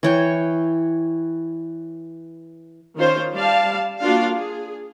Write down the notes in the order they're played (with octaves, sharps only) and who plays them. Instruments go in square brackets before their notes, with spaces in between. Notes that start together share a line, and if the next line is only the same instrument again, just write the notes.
[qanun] E3 C#5 G5
[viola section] D#3 C#4 F4 C5
G3 D5 F5 A5
A#3 D4 F4 F#4 F5
G#4